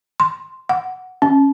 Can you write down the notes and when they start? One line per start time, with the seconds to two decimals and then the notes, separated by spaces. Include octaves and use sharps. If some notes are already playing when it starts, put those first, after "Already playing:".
0.20 C6
0.69 F#5
1.22 C#4